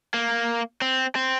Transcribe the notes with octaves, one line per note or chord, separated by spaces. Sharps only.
A#3
C4
C4